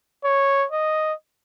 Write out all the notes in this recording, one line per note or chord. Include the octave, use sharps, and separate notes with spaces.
C#5
D#5